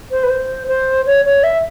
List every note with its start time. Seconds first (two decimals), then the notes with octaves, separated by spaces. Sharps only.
0.11 C5
0.23 B4
0.30 C5
0.67 C5
1.06 C#5
1.25 C#5
1.43 E5